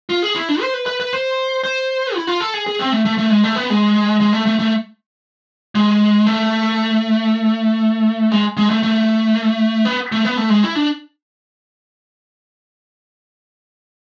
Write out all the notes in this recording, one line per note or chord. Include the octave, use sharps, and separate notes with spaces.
F4
G#4
E4
D4
C5
B4
B4
B4
C5
C5
E4
F4
A4
G#4
G#4
C4
A3
A3
A3
G#3
A3
B3
G#3
G#3
A3
A3
A3
G#3
A3
G#3
G#3
A3
A3
B3
A3
B3
A3
G#3
E4
D4